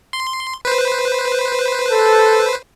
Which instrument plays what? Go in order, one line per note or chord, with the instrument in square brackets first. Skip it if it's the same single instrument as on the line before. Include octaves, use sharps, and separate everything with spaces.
[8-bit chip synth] C6
B4 C5
[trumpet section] A4